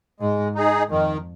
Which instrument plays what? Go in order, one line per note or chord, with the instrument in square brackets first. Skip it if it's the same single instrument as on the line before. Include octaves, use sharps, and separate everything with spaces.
[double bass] G#2 [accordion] G#3
[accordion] D#4 G#4
[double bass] F2 [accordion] D#3